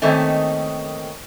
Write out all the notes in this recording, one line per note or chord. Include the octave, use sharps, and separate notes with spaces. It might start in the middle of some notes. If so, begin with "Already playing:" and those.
D#3 A3 A#3 C4 C#4 D#4